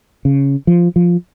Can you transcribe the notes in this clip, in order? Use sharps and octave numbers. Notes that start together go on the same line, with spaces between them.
C#3
F3
F3